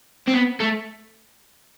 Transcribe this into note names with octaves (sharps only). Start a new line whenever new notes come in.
C4
B3
A3